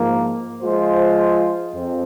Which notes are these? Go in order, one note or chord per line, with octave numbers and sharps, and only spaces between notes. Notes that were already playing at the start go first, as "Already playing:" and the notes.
Already playing: G#2 F3 A#3
F3 G#3 F4 C5
F2 F3 C4